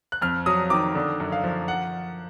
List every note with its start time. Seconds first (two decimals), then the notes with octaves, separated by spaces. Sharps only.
0.12 F#6
0.22 F2 F6
0.46 F#3 D#6
0.70 D#3 D6
0.95 D3
1.20 F#2
1.32 F5
1.44 F3
1.68 F#5